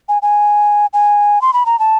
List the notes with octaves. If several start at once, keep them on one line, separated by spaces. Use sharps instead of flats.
G#5
G#5
G#5
C6
B5
A#5
A5